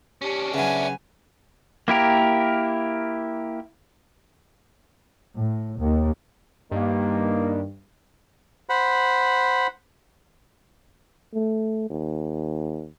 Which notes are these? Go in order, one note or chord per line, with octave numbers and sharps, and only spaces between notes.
C#4 D4 G4
C#3 F#3 B4 E5 G#5
A#3 E4 G4 A#4
A2
D#2
G2 D#3 A#3
C5 F#5 B5
A3
D#2